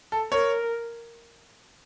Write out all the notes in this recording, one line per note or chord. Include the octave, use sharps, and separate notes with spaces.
A4
A#4 C#5